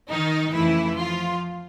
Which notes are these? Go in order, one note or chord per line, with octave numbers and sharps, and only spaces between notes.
D#3 D#4
F2 C#3 E3 F3 A3 E4
F3 F4